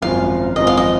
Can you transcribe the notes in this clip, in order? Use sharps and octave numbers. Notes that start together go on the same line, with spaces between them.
G#1 F#2 F3 F5
G#1 F#2 F3 D#5
F5
D#5